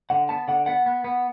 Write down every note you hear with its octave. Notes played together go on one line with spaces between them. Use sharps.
D3 F#5
B3 A5
D3 F#5
B3 F#5
B3
B3